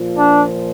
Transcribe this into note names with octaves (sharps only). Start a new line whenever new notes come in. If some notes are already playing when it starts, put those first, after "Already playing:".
Already playing: A#2 F3
D4